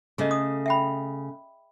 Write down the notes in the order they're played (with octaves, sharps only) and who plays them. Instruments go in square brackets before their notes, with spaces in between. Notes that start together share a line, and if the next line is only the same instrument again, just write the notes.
[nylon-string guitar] C#3 A3 [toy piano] G#4 D#5
[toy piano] D#6
E5 G5 B5